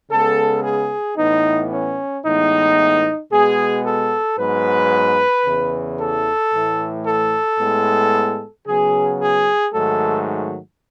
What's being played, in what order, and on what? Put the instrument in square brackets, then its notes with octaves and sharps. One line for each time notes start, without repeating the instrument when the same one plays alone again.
[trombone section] C#3 G#3 B3 A4
G#4
A2 E3 B3 D#4
C#4
A2 E3 G#3 B3 D#4
B2 G#3 B3 G#4
A4
G#2 F#3 B3 B4
E2 C#3 E3
A4
A2 E3 A3
A4
A2 G#3 B3
C#3 F#3 B3 G#4
G#4
G#2 D#3 F#3 A3 A4